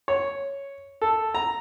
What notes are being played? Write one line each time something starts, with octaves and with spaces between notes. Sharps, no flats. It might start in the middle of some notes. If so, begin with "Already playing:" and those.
C#5
A4
A#5